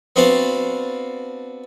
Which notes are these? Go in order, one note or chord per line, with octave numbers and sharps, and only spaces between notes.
B3 C4 D4 F#4 F5 A5